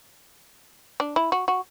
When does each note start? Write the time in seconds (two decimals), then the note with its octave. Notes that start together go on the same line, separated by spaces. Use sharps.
1.00 D4
1.16 E4
1.32 F#4
1.48 F#4